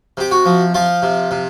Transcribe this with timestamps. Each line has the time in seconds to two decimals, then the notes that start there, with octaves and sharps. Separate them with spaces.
0.17 C3 G4
0.31 F#4
0.45 F3
0.74 F3 F4
1.02 C3
1.31 C3